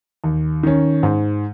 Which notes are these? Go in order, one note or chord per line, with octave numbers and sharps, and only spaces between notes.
D#2
D#3 C#4
G#2